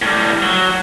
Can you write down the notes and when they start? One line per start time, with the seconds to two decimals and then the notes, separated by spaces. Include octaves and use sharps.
0.02 A2 G3
0.42 F#3